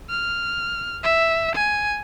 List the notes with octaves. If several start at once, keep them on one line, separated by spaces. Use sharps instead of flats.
F6
E5
G#5